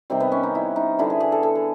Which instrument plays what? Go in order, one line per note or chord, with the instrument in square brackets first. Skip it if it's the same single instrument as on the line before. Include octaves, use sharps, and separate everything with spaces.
[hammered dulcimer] C3 D#3 G3 C4
B3
C#4
D#4
E4
D#4
D3 G3 E4
G#4
G#4
A4
A4
G#4